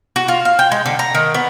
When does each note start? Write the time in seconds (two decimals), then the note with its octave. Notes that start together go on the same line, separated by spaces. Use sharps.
0.16 F#4
0.28 F4
0.45 F5
0.59 G5
0.71 G#3
0.86 D3
0.99 A#5
1.15 D#3
1.34 B3